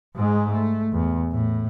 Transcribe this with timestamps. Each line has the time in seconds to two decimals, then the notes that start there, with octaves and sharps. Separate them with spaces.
0.16 G#2 G#3
0.52 A3
0.93 E2
1.32 A2